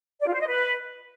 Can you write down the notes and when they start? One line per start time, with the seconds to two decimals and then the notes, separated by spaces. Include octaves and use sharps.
0.21 D5
0.28 F4
0.34 C5
0.41 D#5
0.47 B4